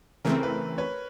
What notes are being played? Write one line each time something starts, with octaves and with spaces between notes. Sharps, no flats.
C#3 E3 A3 C4 A#4
B4
B4 C#5